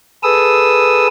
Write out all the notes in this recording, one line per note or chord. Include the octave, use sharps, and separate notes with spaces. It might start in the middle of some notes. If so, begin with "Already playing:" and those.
G#4 A4 B4 D#6 E6